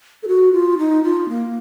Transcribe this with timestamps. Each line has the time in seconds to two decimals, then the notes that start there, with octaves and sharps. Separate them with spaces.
0.23 A4
0.28 F#4
0.53 F4
0.78 D#4
1.04 F4
1.29 A#3